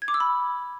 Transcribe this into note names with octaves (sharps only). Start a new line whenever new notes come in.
G#6
D6
E6
B5